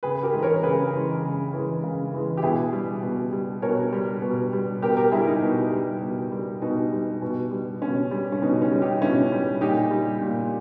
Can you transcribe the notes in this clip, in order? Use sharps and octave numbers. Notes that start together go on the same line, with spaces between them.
C#3 G#4 B4
G4 A#4
E3 G#3
A#4 C#5
C#3 G#4 B4
E3 G#3
C#3
E3 G#3
C#3
E3 G#3
G4
B2 E4 G#4
G3
B2
G3
B2 A#4 C#5
G3
B2
G3
B2 G4 A#4
G4 A#4
G3 E4 G#4
D#4
B2
G3
B2
G3
B2 D#4
G3
B2
G3
B2 C#4
G3
C#4
B2 D#4
C#4
G3
D#4 G4
B2 C#4 E4
G3
A#2 D#4 G4
G3
A#2